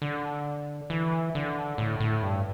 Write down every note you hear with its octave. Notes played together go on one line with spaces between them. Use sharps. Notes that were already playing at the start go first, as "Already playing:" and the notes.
D3
E3
D3
A2
A2
G2